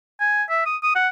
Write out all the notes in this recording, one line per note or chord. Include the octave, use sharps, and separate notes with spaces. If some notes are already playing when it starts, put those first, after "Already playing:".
G#5
E5
D#6
D#6
F#5